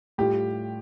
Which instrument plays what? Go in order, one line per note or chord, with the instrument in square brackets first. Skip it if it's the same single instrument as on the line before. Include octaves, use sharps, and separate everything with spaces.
[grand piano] A2 G3 F4 [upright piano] G4